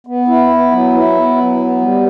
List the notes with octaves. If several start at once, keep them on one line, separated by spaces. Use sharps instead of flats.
B3
E4
B3
F#3
E4
B3
F#3
B3
G3